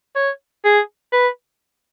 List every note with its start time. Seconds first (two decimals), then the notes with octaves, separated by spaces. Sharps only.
0.16 C#5
0.65 G#4
1.13 B4